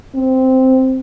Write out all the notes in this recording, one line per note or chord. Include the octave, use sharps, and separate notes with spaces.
C4